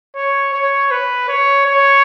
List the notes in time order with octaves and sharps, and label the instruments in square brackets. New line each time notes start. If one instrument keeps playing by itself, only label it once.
[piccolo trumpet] C#5
C#5
B4
C#5
C#5